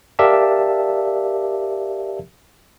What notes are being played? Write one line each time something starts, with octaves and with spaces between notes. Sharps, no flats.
G4 A#4 D5 E5 F5 A5